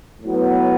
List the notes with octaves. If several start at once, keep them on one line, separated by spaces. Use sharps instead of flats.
A2 F#3 B3